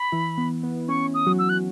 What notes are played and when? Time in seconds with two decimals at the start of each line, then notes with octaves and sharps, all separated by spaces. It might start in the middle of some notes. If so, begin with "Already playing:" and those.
Already playing: B5
0.12 E3 E4
0.38 B3
0.63 B3
0.89 C#4 C#6
1.14 D#6
1.27 F#3 F#4
1.39 E6
1.49 F#6